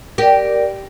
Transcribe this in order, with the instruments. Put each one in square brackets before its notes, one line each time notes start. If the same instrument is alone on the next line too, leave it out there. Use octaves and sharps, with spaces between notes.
[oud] G4 [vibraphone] A#4 D5